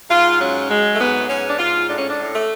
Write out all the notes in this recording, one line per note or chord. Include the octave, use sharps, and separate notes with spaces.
G#2 F4
F#3 C#4
F#3 G#3
A3
G#2 B3
G#2 C#4
D4
G#2 F4
A2 D4
C#4
D4
A2
A3